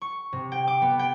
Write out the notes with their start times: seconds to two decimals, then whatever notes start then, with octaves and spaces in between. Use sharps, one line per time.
0.02 C#6
0.33 C3
0.52 G5
0.67 D6
0.82 B3
0.99 G5